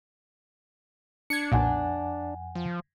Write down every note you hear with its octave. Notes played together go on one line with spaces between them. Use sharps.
D4 G#6 C#7
B1 F2 A#2 F#5 G#5
F3